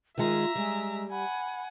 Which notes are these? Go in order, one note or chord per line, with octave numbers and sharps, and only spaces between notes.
D#3 G#3 F4 E5 A#5
G3 G#3
F#5 G#5 B5